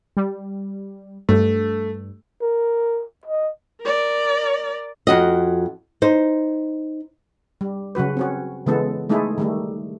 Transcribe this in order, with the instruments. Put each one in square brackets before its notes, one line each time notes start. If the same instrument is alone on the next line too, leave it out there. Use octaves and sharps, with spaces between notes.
[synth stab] G3
[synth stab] G2 [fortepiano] A3
[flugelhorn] A#4
D#5
[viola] A#4 D5
[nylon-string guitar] F2 F#4 D#5
D#4 C5
[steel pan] G3
C#3 F#3 F#4 B4
C4 C#4 F#4
C#3 E3 G#3 B3 A4
G#3 A3 D#4 E4 G#4 A4
D#3 G3 A3